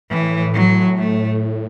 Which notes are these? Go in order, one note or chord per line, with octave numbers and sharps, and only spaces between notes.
A2 E3
F#3
A3